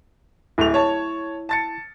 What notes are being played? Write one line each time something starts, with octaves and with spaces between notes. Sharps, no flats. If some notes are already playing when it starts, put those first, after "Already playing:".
D1 A3 E4 F7
C#5 A5
A5 A6 C#7